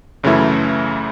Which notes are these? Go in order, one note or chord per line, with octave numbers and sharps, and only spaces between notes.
F#2 C#3 E3 A3 E4